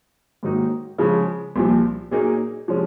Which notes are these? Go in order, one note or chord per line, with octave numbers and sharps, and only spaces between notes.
G#2 D#3 F#3 A#3 D#4
C#3 F3 G#3
C2 A#2 F3
A#2 F#3 A#3 D#4 G#4
C3 F3 G#3 C#4